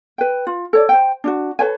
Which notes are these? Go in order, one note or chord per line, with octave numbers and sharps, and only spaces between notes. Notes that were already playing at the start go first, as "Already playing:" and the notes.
B4 G5
F4
A4 C#5 D5
C5 G5
D4 E4 F#4
A4 B4 C#5 G#5